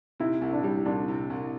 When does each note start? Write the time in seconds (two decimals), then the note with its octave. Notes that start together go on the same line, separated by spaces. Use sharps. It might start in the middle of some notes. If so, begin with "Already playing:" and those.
0.20 C3 E4
0.41 C2
0.53 D4
0.63 G3
0.86 C2 D4
1.08 C3
1.30 C2